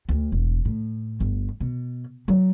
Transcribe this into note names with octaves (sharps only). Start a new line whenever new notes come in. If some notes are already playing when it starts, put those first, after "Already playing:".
D2
E1
A2
G1
B2
F#3